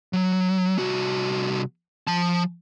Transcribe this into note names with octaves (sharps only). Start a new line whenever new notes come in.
F#3
C2 F#4
F3 A5